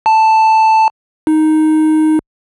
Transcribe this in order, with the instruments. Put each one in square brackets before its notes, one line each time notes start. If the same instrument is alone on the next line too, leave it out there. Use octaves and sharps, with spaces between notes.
[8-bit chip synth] A5
D#4